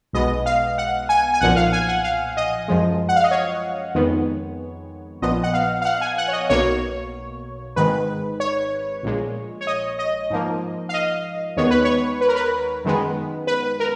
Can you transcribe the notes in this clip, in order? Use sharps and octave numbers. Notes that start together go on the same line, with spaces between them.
B1 B2 G#3 B3 D#5
F5
F#5
G#5
G#5
B1 A#2 F3 F#5
F5
G#5
F#5
F5
D#5
F#2 F3 G#3
F#5
F5
D#5
C#5
F2 D#3 G#3 B3
A#1 A#2 F3 B3 D#5
F#5
F5
F5
F#5
G#5
F#5
C#5
D#5
B1 B2 A#3 C#5
G#1 G#2 D#3 G#3 B4
C#5
A#1 A#2 G#3
C#5
D#5
D#5
G#2 F3 A#3
F5
D#5
D#2 D#3 G#3 B3 C#5
B4
C#5
B4
A#4
B4
F#2 D#3 G#3 B3
B4
A#4